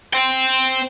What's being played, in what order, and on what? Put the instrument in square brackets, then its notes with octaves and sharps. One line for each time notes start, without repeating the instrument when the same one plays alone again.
[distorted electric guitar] C5 G5